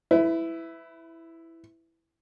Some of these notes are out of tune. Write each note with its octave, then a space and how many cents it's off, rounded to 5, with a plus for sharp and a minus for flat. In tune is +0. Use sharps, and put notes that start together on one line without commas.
E4 +0 B4 +30